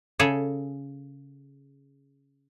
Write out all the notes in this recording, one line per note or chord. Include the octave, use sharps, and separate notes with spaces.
C#3 G#4 A4